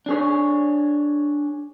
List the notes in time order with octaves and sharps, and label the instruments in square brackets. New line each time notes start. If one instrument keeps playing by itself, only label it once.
[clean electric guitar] D4 G#4 C#5